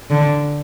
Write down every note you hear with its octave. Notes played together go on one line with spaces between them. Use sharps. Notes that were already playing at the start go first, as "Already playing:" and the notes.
D3